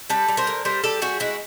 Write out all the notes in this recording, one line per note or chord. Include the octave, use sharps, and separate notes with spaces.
G3 A4 B4
G3
A#4 C5
D3
G3 A#4 C5
G3 G4 A4
G3 F#4 G#4
G#3 E4 F#4